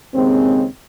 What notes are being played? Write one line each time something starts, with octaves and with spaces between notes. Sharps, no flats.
D#2 C#3 G#3 C4